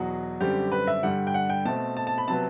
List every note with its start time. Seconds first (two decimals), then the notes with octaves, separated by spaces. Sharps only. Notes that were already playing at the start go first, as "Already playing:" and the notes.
Already playing: E2 B2 F#3 F#4
0.40 F#2 D3 G3 C4 G4
0.72 B4
0.87 E5
1.03 G2 D3 G3 F#5
1.27 G5
1.34 F#5
1.50 G5
1.66 B2 A3 C4 A5
1.97 A5
2.07 A5
2.18 B5
2.28 C3 F#3 B3 A5